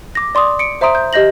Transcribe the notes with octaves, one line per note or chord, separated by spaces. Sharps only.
D6 A#6
D5 C6 D6 D#6
C#7 D7
C5 E5 A#5 C6 D#6 D7
G6
G4 D#5 G6 A#6 F#7